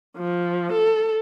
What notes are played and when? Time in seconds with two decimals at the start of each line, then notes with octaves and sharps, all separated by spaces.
0.17 F3
0.73 A4